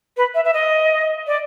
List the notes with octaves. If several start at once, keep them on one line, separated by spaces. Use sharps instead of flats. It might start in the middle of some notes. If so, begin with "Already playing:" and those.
B4
E5
E5
D#5
D5